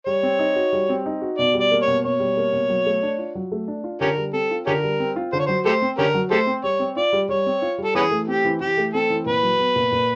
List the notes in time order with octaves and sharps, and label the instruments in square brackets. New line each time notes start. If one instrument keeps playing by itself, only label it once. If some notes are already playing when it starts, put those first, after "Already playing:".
[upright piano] G3 [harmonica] C#5
[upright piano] C4
D#4
F#4
G3
C4
D#4
F#4
[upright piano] B2 [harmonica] D5
[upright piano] G3
[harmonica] D5
[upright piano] A#3
[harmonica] C#5
[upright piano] B2
[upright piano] B2 [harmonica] C#5
[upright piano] G3
A#3
B2
F#3
A3
D4
F4
F#3
A3
D4
F4
[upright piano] D3 [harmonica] C#4 G4 A#4
[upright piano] G3
[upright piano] C4 [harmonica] A4
[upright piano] F4
[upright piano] D3 [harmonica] C#4 G4 A#4
[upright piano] G3
C4
F4
[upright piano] D3 [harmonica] C5
[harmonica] C#5
[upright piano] F#3 [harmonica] C5
[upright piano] A3 [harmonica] G4 A4 C5
[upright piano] C4
[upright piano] D3 [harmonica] C#4 G4 A#4
[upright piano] F#3
[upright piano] A3 [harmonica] G4 A4 C5
[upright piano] C4
[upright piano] G3 [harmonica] C#5
[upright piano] C4
[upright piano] F4 [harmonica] D5
[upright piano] G3
[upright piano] G3 [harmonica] C#5
[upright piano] C4
F4
G3
[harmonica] A4
[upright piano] E3 [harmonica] B3 C#4 G#4
[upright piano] A3
[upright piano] C4 [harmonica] G4
[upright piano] E3
[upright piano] E3 [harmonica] G4
[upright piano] A3
[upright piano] C4 [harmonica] A4
[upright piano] E3
[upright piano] A#2 [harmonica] B4
[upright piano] F#3
B3
A#2
A#2